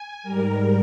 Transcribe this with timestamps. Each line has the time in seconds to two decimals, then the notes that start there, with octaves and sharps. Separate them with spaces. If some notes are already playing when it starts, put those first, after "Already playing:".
Already playing: G#5
0.23 G#2 G3 A#4